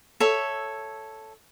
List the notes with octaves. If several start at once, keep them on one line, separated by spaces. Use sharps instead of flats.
A4 C#5 E5